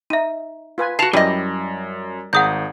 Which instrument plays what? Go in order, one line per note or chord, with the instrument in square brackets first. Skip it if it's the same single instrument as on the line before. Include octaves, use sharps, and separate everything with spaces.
[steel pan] D#4 [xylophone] E5 D#7
[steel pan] F4 B4 G#5
[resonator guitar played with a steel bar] F#4 A5 [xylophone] C7 F7
[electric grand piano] F#2 [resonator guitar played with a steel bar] G3 D#5 [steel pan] E4 G4 D5
[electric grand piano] G#1 [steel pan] G#4 A#5 [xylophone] F#5 D#6 G6